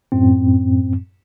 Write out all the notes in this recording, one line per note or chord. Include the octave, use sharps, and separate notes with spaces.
F#2 A2 C4